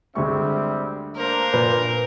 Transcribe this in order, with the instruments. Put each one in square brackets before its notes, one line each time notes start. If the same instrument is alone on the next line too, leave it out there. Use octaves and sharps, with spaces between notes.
[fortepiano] D2 G#3 C#6 [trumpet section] G3 C4 E5
[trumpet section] A#3 D4 C5 [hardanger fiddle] A#4
[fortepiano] A#2 [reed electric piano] B4